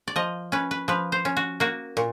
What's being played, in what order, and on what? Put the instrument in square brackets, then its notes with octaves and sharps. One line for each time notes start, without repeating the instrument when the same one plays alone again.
[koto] D5
F3 D#5
C#4 B4
B4
F3 B4
C5
C#4
F#4
A#3 F#4
A#2